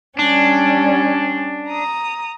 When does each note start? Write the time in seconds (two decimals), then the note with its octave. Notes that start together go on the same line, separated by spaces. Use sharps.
0.19 G3 C#4 D4
1.68 A#5 D#6